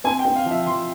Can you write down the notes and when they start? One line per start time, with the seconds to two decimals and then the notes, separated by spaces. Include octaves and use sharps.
0.04 C4 G#5
0.19 G5
0.25 C4
0.35 F5
0.45 F3 E5
0.66 F3 C6